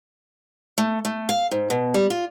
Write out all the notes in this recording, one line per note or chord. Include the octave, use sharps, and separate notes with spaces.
A3
A3
F5
G#2
B2
G3
F4